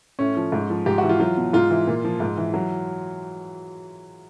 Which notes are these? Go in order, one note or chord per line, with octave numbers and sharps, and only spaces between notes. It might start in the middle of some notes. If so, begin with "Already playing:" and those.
A2 C#4
F3
G#2
F3
G#2 G4
E3 F#4
F4
F#3 F4
B2
G#2 F4
E3
A#2
F3
G#2
E3
F#3